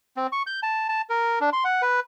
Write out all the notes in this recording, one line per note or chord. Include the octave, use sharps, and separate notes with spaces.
C4
C#6
G6
A5
A5
A#4
D4
C6
F#5
B4